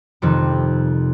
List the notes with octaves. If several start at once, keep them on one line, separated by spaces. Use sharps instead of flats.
F2 C3 D#3 G3 C4